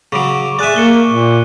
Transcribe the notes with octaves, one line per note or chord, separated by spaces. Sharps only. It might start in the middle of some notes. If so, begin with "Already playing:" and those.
C#3 F#3 C#6 D6 D7
G#4 D5 E5 C#6 F#6 D#7
A#3 C#7 G7
A#2